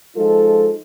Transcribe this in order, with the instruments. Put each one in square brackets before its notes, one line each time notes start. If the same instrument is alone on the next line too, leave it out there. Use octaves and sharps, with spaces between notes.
[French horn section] F3 G#3 D#4 F4 A4